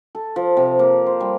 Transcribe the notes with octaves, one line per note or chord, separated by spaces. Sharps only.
A4
F3
C3
A#3
C5
G3